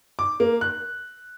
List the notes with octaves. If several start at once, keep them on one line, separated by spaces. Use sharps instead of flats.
D6
A#3
F#6